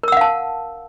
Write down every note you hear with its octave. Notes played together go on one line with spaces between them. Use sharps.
A#4 F5 F#5 A5 E6